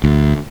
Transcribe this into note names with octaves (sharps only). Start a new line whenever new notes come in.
D2